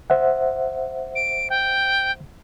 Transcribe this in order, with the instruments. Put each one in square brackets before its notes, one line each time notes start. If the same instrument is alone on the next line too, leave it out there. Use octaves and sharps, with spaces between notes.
[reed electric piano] C5 E5 F#5
[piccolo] D7
G5